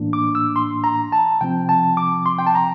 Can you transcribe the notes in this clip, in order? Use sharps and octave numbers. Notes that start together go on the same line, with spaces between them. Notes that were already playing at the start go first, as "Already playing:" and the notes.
Already playing: A2 E3 A#3 D4
D6
E6
C6
A#5
A5
C3 F3 C4 G5
A5
D6
C6
G5
A5
A#5